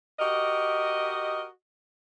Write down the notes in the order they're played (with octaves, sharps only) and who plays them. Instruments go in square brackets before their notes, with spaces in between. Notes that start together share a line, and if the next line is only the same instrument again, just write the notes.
[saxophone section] F#4 G4 A#4 D#5